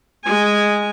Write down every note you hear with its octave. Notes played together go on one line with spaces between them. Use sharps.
G#3 G#5